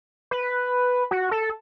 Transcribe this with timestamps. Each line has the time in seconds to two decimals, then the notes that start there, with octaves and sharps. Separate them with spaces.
0.31 B4
1.11 F#4
1.31 A4